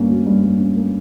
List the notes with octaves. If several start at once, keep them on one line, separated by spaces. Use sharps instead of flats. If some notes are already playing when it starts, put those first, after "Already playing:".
Already playing: G2 A#3 C#4
F#3
G2
G2
C#4
A#3